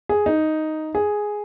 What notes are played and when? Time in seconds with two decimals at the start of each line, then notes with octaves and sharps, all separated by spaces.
0.09 G#4
0.26 D#4
0.95 G#4